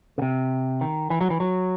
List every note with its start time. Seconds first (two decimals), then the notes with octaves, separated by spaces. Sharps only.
0.18 C#3
0.22 C3
0.81 D#3
1.10 E3
1.21 F#3
1.30 E3
1.40 F#3